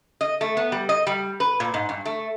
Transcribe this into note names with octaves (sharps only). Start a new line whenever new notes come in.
D#5
A3
B3
G3
D#5
G3
B4
A#2
G#2
G2
A3